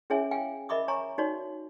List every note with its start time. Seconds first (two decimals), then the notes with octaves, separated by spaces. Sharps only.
0.10 C#4 E4 G#4 C#5 E5 G#5
0.31 F5 G5 G#5
0.69 A#4 D#5 E5 B5 D6 D#6
0.88 C#5 G#5 A#5 C#6
1.18 D#4 F#4 C#5 D5